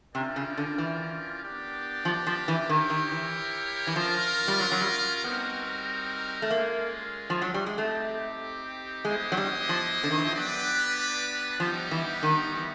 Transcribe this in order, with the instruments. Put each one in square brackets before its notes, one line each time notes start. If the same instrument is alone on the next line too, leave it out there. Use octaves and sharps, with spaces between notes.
[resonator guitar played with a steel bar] C3 [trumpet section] C#4 F4 A#4 D5 G5
[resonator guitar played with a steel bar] C#3
D3
E3
[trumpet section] B3 D4 G4 A#4 D5
[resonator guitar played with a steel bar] F3
F3
E3
[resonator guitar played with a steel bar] D#3 [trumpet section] E4 G4 A#4 C#5
[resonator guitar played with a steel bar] D#3
E3
E3
[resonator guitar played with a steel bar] F3 [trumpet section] C#4 F4 A#4
[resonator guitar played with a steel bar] G3
F#3
F#3
G3
[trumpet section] G3 C4 D#4 F#4 A#4 [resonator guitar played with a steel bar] B3
[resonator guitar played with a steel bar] A3
[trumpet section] G#3 C#4 F4 [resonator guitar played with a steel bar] A#3
[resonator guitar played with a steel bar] F3
F#3
G3
G#3
[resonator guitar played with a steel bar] A3 [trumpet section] C4 D#4 G4
[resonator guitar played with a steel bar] G#3 [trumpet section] B3 E4 G4 C5 D#5
[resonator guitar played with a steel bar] F#3
G3
F3
D3
D#3
E3
F3
[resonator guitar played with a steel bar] F#3 [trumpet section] B3 D4 G4 B4 D5
[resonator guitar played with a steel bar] F3 [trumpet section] G3 B3 D#4 G4
[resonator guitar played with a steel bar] E3
D#3
E3